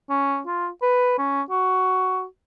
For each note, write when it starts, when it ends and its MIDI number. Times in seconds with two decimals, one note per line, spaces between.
0.10 0.41 61
0.47 0.68 65
0.82 1.17 71
1.18 1.42 61
1.50 2.24 66